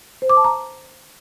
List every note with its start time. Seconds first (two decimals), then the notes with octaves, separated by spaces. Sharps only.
0.22 C5
0.30 D6
0.37 A5
0.44 A#5